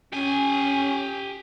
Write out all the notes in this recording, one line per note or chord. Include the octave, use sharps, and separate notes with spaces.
C#4 G4 G#5